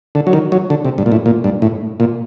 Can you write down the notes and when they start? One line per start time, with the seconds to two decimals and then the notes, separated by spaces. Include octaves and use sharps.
0.15 D3
0.27 F#3
0.33 D#3
0.52 F#3
0.70 D3
0.85 C3
0.98 G2
1.06 A#2
1.12 A2
1.26 A#2
1.44 G2
1.62 A2
2.00 A#2